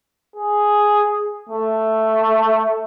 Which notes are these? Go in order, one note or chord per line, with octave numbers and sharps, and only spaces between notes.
G#4
A3